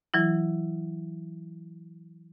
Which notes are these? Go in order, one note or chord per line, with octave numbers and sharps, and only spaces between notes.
E3 F#3 E4